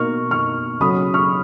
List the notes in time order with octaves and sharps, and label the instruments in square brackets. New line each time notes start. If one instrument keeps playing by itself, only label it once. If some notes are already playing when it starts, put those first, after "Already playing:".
Already playing: [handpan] B2 A#3 D#4 A#4 [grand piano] C#6 F6
[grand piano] C#6 F6
[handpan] C#3 F#3 C#4 F#4 [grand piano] B5 D#6
[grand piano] C#6 F6